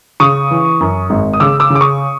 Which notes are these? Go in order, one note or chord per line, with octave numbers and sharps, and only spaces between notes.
C#3 C#6 D#6
E3
F#2
G#1
D#6
C#3 D6 E6
D6 E6
C#3
D6
C#6 D#6